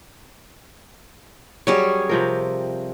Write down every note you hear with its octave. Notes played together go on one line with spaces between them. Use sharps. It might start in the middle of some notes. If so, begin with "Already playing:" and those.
F#3 G3 C#4 G#4 C#5
C3 F3 A#4